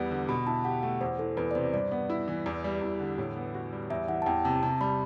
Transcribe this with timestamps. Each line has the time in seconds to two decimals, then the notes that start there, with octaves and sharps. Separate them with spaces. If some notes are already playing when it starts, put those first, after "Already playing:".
Already playing: E2 G3 B3
0.11 D3
0.28 B2 B5
0.47 E4 A5
0.65 G4 F#5
0.83 A3 F#5
1.01 E2 C5
1.19 E3 A4
1.37 E2 B4
1.51 D5
1.55 C3 C5
1.74 G2 D5
1.91 B3
2.10 E4
2.28 E3
2.46 E2
2.64 G3
2.82 E2
3.00 D3
3.18 A2
3.36 B3
3.54 F#4
3.72 G3
3.90 E2 E5
4.08 E3 F#5
4.22 A5
4.26 E2 G5
4.45 C3 A5
4.63 C3 A5
4.81 G3 B5